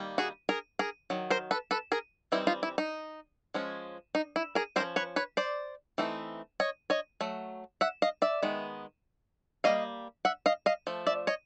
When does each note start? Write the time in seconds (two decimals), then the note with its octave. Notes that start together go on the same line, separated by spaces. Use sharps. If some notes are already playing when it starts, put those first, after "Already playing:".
Already playing: D#3 G3 A#3
0.18 F#4 G#4
0.49 G#4 A#4
0.79 G#4 A#4
1.10 D#3 F#3
1.30 A#4 C5
1.51 A4 B4
1.71 A4 B4
1.92 G#4 A#4
2.32 E3 G3 C4 D#4 E4
2.47 D#4 F4
2.63 E4
2.78 D#4
3.54 F3 G#3 C#4
4.15 D#4
4.36 E4
4.55 G#4 A#4
4.76 A3 C#4 A#4 C5
4.80 F3
4.96 B4 C#5
5.16 B4 C#5
5.37 C5 D5
5.98 E3 A3 C4 D#4
6.60 C#5 D#5
6.90 C#5 D#5
7.21 F#3 A3
7.81 E5 F#5
8.02 D#5 F5
8.22 D5 E5
8.43 D#3 G#3 B3
9.64 G3 A#3 D#5 F5
10.25 E5 F#5
10.46 D#5 F5
10.66 D#5 F5
10.87 F3 A3
11.07 D5 E5
11.27 C#5 D#5